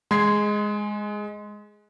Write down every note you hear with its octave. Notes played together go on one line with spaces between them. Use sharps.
G#3 C6 G#6 C7